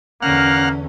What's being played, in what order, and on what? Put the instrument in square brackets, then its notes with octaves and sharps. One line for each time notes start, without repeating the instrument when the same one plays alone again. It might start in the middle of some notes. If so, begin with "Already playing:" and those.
[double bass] E2 D3 [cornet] A#3 [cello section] C#4 [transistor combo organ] F#5 F6